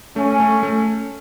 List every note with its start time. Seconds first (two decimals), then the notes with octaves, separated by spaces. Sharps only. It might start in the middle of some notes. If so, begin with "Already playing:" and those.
0.16 A3 C#4
0.40 A3
0.63 A3